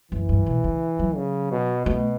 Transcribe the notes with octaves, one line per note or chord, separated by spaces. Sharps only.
F#2 E3
G2
B2
C#3
F#3
C#3
B2
B2 A3